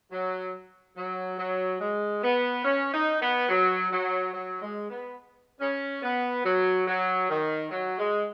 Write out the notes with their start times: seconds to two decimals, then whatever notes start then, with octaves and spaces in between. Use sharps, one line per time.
0.12 F#3
0.96 F#3
1.38 F#3
1.80 G#3
2.22 B3
2.64 C#4
2.93 D#4
3.21 B3
3.49 F#3
3.92 F#3
4.33 F#3
4.61 G#3
4.89 B3
5.60 C#4
6.02 B3
6.44 F#3
6.87 F#3
7.29 D#3
7.71 F#3
7.98 G#3